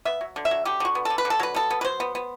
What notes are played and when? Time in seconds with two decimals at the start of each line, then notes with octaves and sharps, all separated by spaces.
0.05 B3 E5
0.21 F#3
0.36 D3
0.45 E5
0.51 F#3
0.65 D3 G4
0.80 D3 F#4
0.95 B3
1.05 D3 A4
1.18 B4
1.25 D3
1.30 A4
1.40 F#3 B4
1.54 B3 A4
1.70 B3
1.81 B4
1.85 F#3 C5
2.00 B3
2.15 B3